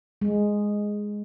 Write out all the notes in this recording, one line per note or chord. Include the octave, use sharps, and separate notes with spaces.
G#3